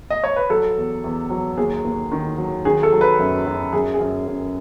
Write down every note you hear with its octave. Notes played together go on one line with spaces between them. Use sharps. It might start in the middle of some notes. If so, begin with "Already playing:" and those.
D#5
C#5
B4
F#3 A4
E2
E2
F#3
D#2 G#4
D#2
D#3
F#3
D#3 G#4
A4
F#3
B4
F#2
F#2
F#2 G#4
G#4
F#2
F#2